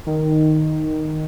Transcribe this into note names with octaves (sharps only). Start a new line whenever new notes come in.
D#3